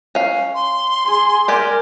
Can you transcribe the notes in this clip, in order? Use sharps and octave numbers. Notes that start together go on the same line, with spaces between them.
C#4 F5
C6
G#4
G4 A#4 D5 G#5